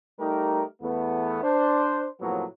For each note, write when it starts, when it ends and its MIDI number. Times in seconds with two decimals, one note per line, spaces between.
0.19 0.63 55
0.19 0.63 57
0.19 0.63 63
0.19 0.63 67
0.19 0.63 70
0.82 1.41 40
0.82 1.41 57
0.82 1.41 59
1.43 2.08 62
1.43 2.08 72
2.20 2.44 45
2.20 2.44 48
2.20 2.44 53
2.20 2.44 54
2.20 2.44 58
2.20 2.44 59